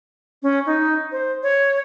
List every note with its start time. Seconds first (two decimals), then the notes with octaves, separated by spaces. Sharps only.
0.43 C#4
0.66 D#4
1.12 C5
1.43 C#5